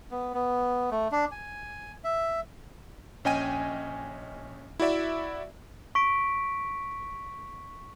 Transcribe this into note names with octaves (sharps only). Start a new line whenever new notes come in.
B3
B3
A3
D4
G#5
E5
A#1 C#4 D#5 G5 G#5 D#7
E4 F#4 D5 E5
C#6 B6 D7